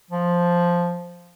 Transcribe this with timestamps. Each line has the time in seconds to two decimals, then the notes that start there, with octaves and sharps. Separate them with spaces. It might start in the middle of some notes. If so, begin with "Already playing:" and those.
0.11 F3